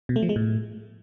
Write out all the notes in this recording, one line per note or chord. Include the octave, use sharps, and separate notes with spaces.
B2
A3
F3
G#3
A2